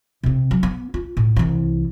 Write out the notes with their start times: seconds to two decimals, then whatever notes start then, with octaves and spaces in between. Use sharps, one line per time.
0.23 C3 C4
0.51 F#3
0.63 B3
0.94 F4
1.17 A2
1.36 C2 E3